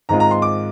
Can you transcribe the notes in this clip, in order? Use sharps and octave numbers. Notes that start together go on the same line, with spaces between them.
G#2 D#3 G#3 C4 F4 A#5
A#5
C6
D6